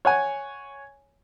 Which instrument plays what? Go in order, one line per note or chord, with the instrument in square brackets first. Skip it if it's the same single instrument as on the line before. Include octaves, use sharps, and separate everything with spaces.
[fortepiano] C#5 F#5 G#5